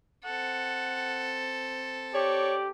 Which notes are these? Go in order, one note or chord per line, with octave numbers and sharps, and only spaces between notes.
C4 A4 F#5
G4 C#5 D5